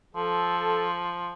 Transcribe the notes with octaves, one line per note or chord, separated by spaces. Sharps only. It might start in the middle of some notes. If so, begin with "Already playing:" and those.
F3 A4